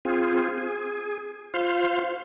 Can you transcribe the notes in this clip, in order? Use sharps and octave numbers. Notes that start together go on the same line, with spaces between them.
C4 F4 G#4
G#4
F4 C5 F5